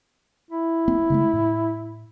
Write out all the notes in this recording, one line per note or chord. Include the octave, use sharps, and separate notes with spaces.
E4
A#3 C4
C#3 G#3 A3
A2